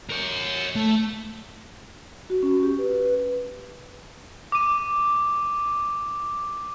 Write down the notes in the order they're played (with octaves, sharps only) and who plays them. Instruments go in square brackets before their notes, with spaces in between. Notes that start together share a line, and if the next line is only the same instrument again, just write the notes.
[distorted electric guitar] A#4 C#5
A3
[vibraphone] F#4
C#4
G4
B4
B4
[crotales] D6 D#7